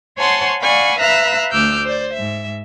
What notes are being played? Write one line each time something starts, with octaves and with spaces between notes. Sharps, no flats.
C5 C#5 F#5 G#5 A5 C6
D5 F5 F#5 G#5 B5 C#6
B4 E5 F5 A#5 E6 F#6
D2 D6 E6 F6 G6
C5 D5
G#2 E5